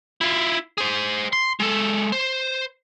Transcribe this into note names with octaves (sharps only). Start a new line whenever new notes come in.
E4 F4
G#4 C5
C6
G#3 A4
C5